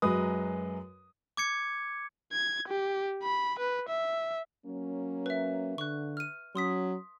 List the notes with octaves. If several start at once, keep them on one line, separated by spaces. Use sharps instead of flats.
F#2 F#3 G#3 B4 D#6
D6 G#6 C#7
G#6
G4
B5
B4
E5
F#3 A#3 C#4
B4 E5
D3 C#6 F#6
F6 D#7
F#3 C#4 C6 D#6 B6